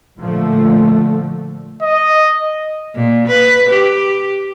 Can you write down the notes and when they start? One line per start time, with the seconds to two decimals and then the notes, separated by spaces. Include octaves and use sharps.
0.20 A#2 D3 F3 A3
1.82 D#5
2.95 A#2
3.27 B4
3.69 G4